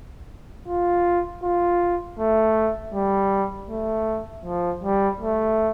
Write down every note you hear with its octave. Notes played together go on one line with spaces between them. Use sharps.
F4
F4
A3
G3
A3
F3
G3
A3